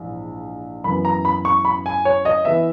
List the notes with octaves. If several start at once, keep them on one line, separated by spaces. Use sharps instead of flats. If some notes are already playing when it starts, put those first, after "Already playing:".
Already playing: A#1 G#2 E3
F#2 E3 B3 B5
A#5
B5
C#6
B5
G#5
C#5
D#5
E3 B3 E5